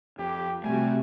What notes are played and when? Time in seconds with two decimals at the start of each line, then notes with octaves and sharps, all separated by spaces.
0.19 F2 G4
0.64 C3 G3 A3 F#4 G#5